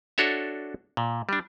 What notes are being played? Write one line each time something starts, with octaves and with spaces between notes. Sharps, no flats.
D4 F#4 A4 C#5 E5
A#2
G3 D4